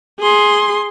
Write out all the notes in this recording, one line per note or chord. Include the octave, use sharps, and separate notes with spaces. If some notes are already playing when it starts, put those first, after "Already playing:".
G#4 C6